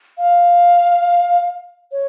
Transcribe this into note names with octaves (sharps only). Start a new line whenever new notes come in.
F5
C#5